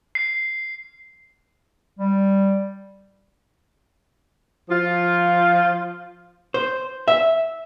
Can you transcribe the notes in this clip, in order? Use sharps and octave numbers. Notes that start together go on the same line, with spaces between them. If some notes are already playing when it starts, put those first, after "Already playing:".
C7
G3
F3 F4
C5
E5